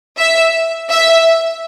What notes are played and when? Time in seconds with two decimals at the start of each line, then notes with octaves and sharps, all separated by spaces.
0.19 E5
0.90 E5